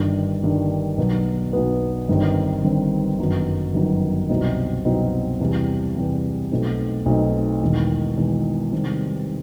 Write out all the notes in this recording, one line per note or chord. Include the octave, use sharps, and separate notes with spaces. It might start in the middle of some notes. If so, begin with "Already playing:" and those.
Already playing: G1 G2 D#3
G1 G2 D#3
B1 B2 F#3 B3
B1 B2 F#3 B3
G1 G2 D#3 G3 C4
G1 G2 D#3 G3 C4
G1 F#2 D#3 F#3 B3
G1 F#2 D#3 F#3 B3
C2 B2 F#3 C4 D#4
C2 B2 F#3 C4 D#4
E2 C3 E3 G3
E2 C3 E3 G3
B1 B2 A3 C4 D#4
B1 B2 A3 C4 D#4
E1 E2 D#3
E1 E2 D#3
C3 D#3 G3 C4